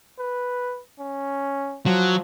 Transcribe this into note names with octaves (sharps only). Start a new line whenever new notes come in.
B4
C#4
F3 F#3